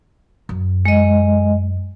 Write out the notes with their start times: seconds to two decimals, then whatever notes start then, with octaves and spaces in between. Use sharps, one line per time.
0.49 F#2
0.85 G#3 D#5